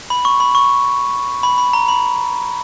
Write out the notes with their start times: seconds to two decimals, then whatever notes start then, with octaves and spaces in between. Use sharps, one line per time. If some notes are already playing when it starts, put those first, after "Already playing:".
0.10 B5
0.25 C#6
0.40 B5
0.55 C#6
1.43 B5
1.58 B5
1.73 A#5
1.88 B5